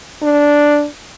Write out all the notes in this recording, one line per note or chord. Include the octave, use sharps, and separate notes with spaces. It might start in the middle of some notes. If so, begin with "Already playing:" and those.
D4